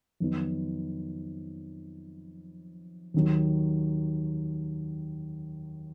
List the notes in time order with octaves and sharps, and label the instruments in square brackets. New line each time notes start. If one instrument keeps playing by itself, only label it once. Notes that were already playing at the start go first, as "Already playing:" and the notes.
[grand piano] F2 D#3 F#3 B3 D#4
D#2 D#3 F#3